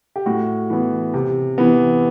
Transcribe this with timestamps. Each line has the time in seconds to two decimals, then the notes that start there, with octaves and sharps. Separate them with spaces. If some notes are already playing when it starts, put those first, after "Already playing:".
0.16 G4
0.26 A2 F#4
0.70 E3 B3
1.14 C3
1.58 E3 B3